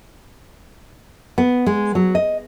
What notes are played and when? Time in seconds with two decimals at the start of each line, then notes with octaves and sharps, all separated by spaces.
1.38 B3
1.66 G#3
1.95 F#3
2.15 D#5